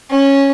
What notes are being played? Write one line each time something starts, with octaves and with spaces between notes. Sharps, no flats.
C#4